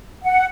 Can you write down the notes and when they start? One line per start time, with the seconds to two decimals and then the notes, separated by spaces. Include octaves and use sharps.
0.23 F#5